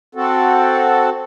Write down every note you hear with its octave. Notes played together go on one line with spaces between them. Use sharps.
C4 F#4 A4